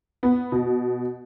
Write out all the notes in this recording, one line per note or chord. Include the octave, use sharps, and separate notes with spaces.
B3
B2